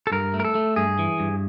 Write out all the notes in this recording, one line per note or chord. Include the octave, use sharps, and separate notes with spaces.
A4
G2 A#4
A3
A#4
A4
A3
G2 G#4
E3
G2